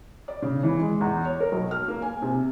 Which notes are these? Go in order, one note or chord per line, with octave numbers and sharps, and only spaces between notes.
D5
C#3
E3
G#3
E2
C#5
A#4
B1
F6
A#3
G#5
C3